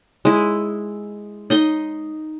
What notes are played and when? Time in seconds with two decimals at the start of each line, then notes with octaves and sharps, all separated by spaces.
0.25 G#3 E4
1.50 D#4 D#5 C6